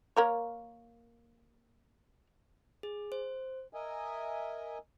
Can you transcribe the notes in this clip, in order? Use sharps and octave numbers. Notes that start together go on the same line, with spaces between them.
A#3 A#4 C#5
G#4
C5
A#4 D#5 E5 G#5